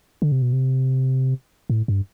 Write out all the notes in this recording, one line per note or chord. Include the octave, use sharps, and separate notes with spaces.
D3
C3
B2
C3
A2
G2